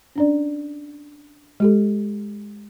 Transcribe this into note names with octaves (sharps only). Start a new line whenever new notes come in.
C#4 D4 D5
G#3 G4 A4